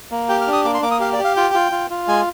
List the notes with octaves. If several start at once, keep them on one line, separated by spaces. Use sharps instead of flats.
A#3
G4 G5
F6
D4
D#6
A#3 D6
C6
A#3 D6
D#6
G4 F5
D5
G4
F5
F4 G5
F4
F4
F4
G#3 G#5